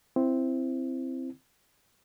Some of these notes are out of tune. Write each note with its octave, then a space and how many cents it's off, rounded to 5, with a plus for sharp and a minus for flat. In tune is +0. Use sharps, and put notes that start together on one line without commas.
C4 +0 E4 +15